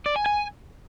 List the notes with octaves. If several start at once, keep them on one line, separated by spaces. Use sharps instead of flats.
D5
G#5
G#5